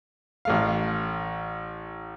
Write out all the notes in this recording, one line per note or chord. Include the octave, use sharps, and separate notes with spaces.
A1 A3 F5